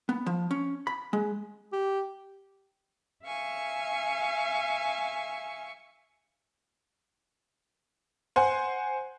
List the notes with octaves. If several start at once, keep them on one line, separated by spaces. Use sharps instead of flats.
B3
F3
C#4
B5
G#3
G4
E5 F5 G#5 C#6
C5 F#5 G#5 C6